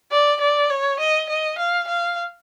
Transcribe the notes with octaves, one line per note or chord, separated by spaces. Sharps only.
D5
D5
C#5
D#5
D#5
F5
F5